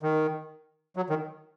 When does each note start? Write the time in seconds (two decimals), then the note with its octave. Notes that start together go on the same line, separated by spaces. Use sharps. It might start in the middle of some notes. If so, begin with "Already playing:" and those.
0.03 D#3
0.96 F#3
1.10 D#3